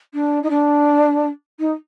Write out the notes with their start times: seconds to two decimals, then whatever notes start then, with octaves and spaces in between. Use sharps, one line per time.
0.14 D4
0.43 D#4
0.50 D4
1.59 D#4